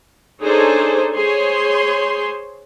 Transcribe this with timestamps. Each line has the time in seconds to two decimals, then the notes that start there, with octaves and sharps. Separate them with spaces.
0.42 D4 D#4 G#4 A4 C5 C#5
1.14 G#4 C5 C#5 C6